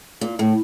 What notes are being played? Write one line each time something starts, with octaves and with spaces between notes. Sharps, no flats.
A#2
A2